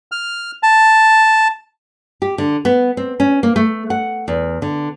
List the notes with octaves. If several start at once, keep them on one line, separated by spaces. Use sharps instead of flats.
F6
A5
G4
D3
B3
C4
C#4
A#3
A3
F#5
E2
D3